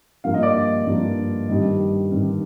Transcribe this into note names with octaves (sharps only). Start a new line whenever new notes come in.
G2 F3 A#3 D4 F5
D#5
D5
D#5
G2 F3 A#3 D4
G2 D#3 G3 D4 D#5
G2 D#3 G3 D4